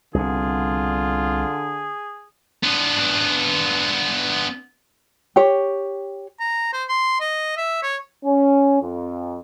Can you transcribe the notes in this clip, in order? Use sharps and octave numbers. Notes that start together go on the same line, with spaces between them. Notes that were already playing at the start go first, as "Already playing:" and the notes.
C2 B2 D3 F4 G#4
B3 D4
G4 C#5
A#5
C5
C6
D#5
E5
C#5
C#4
F2